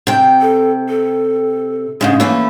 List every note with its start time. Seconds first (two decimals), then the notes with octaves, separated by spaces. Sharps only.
0.07 C3 G5
0.41 A4
0.89 A4
2.01 G#2 C#3 G#3 C#4
2.20 E3 A3 A#3 C#4